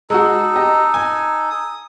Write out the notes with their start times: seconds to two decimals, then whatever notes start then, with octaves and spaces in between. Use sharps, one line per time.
0.10 G#3 D#4 F#4 A4
0.56 G4 D#5
0.94 G#5
1.50 D#6